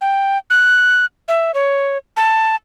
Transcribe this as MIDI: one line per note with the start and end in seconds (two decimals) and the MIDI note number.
0.01 0.38 79
0.50 1.05 90
1.28 1.51 76
1.54 1.98 73
2.17 2.56 81